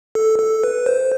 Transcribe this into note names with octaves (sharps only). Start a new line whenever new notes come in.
A4
A4
B4
C5